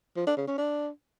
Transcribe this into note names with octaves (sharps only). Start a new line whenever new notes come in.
F3
D4
C#3
C#4
D4